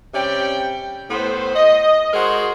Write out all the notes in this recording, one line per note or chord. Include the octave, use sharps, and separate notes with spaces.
C3 G3 C#4 D5 G5
A2 B3 C5
D#5
G#3 F#4 G#4 A#4 C5 C6